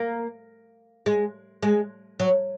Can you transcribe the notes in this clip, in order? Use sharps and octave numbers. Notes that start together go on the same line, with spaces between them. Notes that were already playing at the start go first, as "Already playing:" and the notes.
Already playing: A#3
G#3
G#3
F#3